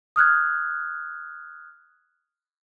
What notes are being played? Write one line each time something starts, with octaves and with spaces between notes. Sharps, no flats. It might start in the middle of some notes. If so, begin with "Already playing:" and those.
D#6 F6 F#6 G#6